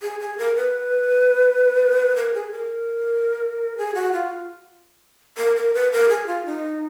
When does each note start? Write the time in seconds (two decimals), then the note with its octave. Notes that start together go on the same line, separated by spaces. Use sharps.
0.02 G#4
0.20 G#4
0.38 A#4
0.56 B4
2.16 A#4
2.34 G#4
2.52 A#4
3.78 G#4
3.95 F#4
4.13 F4
5.37 A#4
5.56 A#4
5.74 B4
5.92 A#4
6.09 G#4
6.27 F4
6.46 D#4